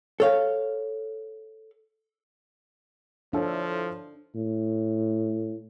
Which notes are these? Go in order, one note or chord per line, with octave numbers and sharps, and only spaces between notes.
A4 C#5 F5
F3 D4 E4 A4 C#5
A2